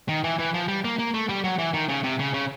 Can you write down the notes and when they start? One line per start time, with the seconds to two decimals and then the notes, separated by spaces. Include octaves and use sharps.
0.09 D#3
0.24 E3
0.39 E3
0.54 F3
0.68 G3
0.85 A#3
0.99 A#3
1.14 A3
1.29 G3
1.44 F#3
1.59 E3
1.74 D#3
1.89 C#3
2.04 C3
2.19 C#3
2.34 C#3